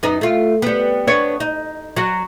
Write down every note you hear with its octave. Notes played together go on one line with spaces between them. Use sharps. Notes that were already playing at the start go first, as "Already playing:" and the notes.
F#2 B3 D#4
A3 F4
G3 B3
B3 D4 C#5
D#4
F#3 F#4